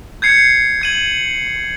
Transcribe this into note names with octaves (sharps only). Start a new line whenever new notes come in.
G6 G#6 C7 C#7
G#6 D#7 F#7